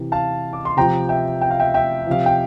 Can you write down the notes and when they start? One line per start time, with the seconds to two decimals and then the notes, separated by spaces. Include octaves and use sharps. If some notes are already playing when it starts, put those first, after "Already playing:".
Already playing: C3 E3
0.12 F5 A5
0.53 D6
0.65 C6
0.77 C3 F3 G5 A#5
1.09 E5 G5
1.41 G5
1.50 F5
1.60 E5 G5
1.74 E5 G5
2.07 C3 F3 F5
2.26 G5